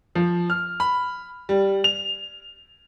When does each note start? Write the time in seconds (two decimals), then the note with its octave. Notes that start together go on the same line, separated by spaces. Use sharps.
0.15 F3
0.50 F6
0.80 B5
1.49 G3
1.84 F7